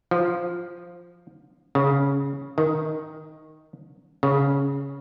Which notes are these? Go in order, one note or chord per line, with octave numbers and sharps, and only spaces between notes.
F3
C#3
D#3
C#3